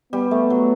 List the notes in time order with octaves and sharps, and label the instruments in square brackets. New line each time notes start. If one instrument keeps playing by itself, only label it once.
[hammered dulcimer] G3 [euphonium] B3
[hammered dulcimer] A3
F#3